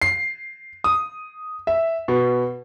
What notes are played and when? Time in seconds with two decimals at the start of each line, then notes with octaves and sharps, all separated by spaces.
0.02 C7
0.84 D#6
1.67 E5
2.08 B2